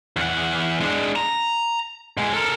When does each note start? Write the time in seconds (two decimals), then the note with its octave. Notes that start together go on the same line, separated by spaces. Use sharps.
0.17 E2 F#5
0.81 G#3 D4
1.16 A#5
2.17 B2 G#3
2.33 A4 A#4